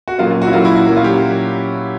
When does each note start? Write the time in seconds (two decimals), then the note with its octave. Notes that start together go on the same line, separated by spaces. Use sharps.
0.08 F#4
0.18 A#2 F#3 A#3 C#4 F4
0.30 F4
0.42 F#4
0.47 E4
0.53 A#2 F#3 A#3 C#4 F4
0.65 E4
0.75 F#4
0.87 A#2 F#3 A#3 C#4
0.96 F4
1.04 G4